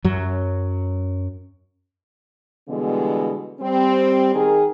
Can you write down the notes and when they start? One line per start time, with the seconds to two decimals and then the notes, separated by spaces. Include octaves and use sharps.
0.04 F#2 F#3
2.69 B2 D3 E3 G3 G#3 B3
3.60 G3 C4
4.34 D#3 G#4 A#4